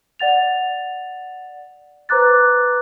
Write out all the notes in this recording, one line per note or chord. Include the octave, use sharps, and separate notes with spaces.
D5 F#5 A6 F7
B4 C5 A#5 D6 F#6 A6